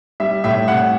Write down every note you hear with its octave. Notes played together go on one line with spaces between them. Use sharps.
G3 E5
A2 E5
A2 F#5